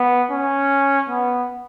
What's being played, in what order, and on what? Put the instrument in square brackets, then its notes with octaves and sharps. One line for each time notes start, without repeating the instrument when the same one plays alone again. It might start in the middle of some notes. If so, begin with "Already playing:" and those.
Already playing: [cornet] B3
C#4
B3